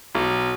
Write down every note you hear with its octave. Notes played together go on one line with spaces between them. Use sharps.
B1